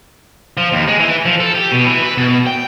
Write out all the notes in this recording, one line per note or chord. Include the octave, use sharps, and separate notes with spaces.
F3
D#2
G#3
E3
F3
A4
G4
B2
E3
B4
B2
G5